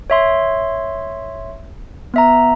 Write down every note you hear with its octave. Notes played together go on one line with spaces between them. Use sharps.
C#5 E5 C6
B3 E5 A#5